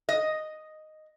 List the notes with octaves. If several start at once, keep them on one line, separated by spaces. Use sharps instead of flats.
D#5